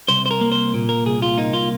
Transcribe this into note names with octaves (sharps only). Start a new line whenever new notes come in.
C2 C5
C5
A#4
A#3
C5
A#2
A#4
C2 G#4
F4
A#3 D#4
F4